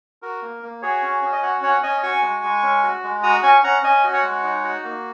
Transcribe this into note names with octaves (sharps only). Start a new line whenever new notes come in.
F#4 A#4
A#3
A#3
F#4 G#4 C#5
C#4
C#4
D#5
F#4 C#5 F#5
C#4 C#5 F#5
C#4 D#5 G#5
F#4 G#5 C#6
G#3
G#3
C#4
F#4
G#3
F#4 A#5 D#6
C#4 G#5 C#6
C#4 F#5 A#5
C#4 D#5 G#5
F#4
C#5 F#5
G#3
D#4
F#4
A#3